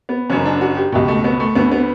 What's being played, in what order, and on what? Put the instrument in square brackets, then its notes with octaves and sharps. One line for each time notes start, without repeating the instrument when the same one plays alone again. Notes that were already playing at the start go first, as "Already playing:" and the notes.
[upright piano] B3
F#1 F#2 D3 C#4
D4
F#4
G4
C#2 B2 G4
A3
B3
A3
D2 D3 B3
B3